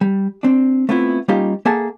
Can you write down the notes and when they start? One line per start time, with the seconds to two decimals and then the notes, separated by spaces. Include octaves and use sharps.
0.01 G3
0.43 C4 D4
0.89 A3 B3 C4 E4 F4
1.28 G3 A#3 C#4 D#4 F4 G4
1.66 A#3 G#4 A4 E5 F#5 A5